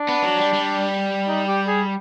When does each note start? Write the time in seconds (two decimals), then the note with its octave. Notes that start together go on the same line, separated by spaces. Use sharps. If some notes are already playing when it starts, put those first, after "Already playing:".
Already playing: D4
0.09 B3
0.23 F#3
0.38 G3
0.53 G3
1.28 D#4
1.48 G4
1.67 G#4